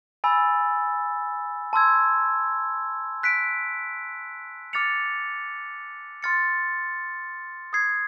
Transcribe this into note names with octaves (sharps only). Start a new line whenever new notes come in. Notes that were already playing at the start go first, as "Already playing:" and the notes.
G#5 B5 E6 A6
A5 C6 E6 G#6
F#6 B6 D7
D6 F6 A6 C#7 F7
C6 F6 A6 C#7
D#6 G#6 C7